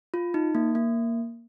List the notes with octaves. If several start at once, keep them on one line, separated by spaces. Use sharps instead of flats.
F4
D#4
A#3
A#3